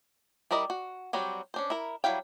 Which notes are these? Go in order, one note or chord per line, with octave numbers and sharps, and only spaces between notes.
G3 E4 A#4 D5 D#5
F#4
F#3 G3 C4 F#4
C#4 D4 C5
E4 A#4
F#3 G3 E4 F5 G5